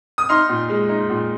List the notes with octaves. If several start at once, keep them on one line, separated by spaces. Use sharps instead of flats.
D#6
D#4 C6 F6
A#2
G#3
D#4
A#2